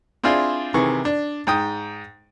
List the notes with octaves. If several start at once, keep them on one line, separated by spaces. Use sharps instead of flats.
C4 D4 E4 F4 G#4 C5
C3 D#3 E3 G#4 C#6
D4
G#2 G5 D#6